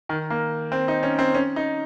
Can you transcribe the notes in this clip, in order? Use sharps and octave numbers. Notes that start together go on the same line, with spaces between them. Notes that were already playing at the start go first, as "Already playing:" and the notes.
D#3
A#3
C4
D#4
C#4
C4
C#4
D#4